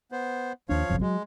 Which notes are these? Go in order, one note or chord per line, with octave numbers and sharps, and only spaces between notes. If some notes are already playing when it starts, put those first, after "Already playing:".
B3 C5
D#2 F3 D4 C#5 F5
F#1 B1 F2
F#3 G#3